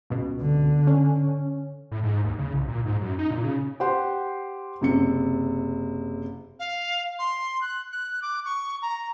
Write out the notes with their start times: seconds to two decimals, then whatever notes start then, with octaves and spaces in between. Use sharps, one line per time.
0.10 C#2 B2
0.41 D3
0.87 C#4
1.91 A2
2.03 G#2
2.24 D#2
2.38 C#3
2.54 C2
2.68 A#2
2.85 G#2
3.01 F#2
3.19 D#4
3.31 A#2
3.44 C#3
3.80 G4 C5 F#5 C6
4.81 F#1 C3 C#7
6.59 F5
7.19 C6
7.61 F#6
7.92 F#6
8.22 D6
8.45 C#6
8.82 A#5